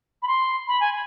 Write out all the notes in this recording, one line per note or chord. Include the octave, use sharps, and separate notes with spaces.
B5
C6
B5
G#5